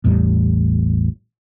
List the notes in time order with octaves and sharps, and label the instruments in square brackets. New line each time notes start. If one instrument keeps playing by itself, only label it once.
[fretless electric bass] A1 E2 A2 G3